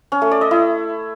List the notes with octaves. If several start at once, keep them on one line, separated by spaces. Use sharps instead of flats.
C#4
A3
D5
D#5
E4